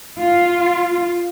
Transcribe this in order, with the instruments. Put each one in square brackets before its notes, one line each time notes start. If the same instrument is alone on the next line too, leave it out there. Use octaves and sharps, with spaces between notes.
[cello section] F4